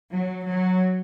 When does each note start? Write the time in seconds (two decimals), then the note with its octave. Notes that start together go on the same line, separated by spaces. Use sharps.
0.12 F#3
0.48 F#3